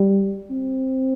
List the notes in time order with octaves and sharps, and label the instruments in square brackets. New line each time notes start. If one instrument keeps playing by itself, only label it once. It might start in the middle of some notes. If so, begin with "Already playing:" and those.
Already playing: [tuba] G3
C4